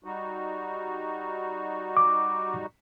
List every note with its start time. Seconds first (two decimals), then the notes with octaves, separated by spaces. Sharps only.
0.04 G3 D#4 F#4
1.97 D6